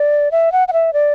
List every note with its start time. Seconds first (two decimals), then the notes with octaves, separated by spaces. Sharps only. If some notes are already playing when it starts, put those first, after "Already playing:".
Already playing: D5
0.32 E5
0.52 F#5
0.68 F#5
0.73 E5
0.93 D5